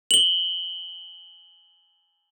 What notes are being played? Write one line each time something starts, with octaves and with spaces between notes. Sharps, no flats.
F#7 G7